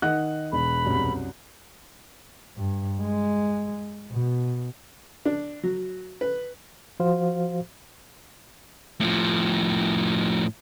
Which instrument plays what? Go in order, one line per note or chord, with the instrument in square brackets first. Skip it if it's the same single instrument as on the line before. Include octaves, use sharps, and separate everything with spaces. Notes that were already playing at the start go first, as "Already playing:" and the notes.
[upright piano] D#3 [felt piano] D#5 F#5 F#6
[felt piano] E1 [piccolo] B5
[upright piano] C2 F#2
[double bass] G2
G#3
B2
[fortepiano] D4
F#3
B4
[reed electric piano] F3 F#4 C5 F5
[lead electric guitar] A2 F3